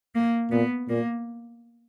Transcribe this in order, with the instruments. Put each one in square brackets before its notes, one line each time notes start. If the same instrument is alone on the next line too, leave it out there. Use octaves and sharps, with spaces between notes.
[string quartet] A#3
[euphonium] A#2 [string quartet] B3
[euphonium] A#2 [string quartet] A#3